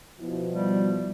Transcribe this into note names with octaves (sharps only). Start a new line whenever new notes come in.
B2 F3 E4
G3